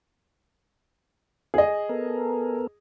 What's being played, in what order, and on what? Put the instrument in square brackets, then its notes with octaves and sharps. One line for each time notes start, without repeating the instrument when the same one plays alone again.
[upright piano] G#4 D#5
[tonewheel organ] B3 A4 A#4